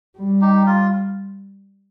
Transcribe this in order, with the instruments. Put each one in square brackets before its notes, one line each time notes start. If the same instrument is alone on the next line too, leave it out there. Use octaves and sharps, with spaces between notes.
[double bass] G3
[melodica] D#4 G4
F4